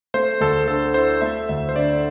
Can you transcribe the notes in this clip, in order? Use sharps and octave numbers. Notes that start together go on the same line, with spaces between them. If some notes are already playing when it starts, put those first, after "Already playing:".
A3 C5
D2 A4
D3 A4
E4 C5
A3 E5
D2 E5
C5
D3 D5